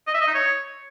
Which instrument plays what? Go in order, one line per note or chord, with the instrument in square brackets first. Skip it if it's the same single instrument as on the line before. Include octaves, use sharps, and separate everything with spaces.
[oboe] D#5
E5
D#5
D#4
C#5